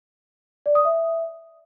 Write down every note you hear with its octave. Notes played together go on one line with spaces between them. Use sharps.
D5
D#6
E5